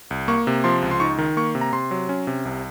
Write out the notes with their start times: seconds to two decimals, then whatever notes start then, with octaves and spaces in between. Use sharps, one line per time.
0.11 C2
0.28 A#3 C#6
0.47 C3
0.64 F3 C6
0.82 C#2
0.91 C6
1.00 D#4 C#6
1.18 D#3
1.37 A#3 C#6
1.55 C3
1.61 A#5
1.73 C3 C6
1.91 F#3
2.09 C#4
2.27 C3
2.45 C2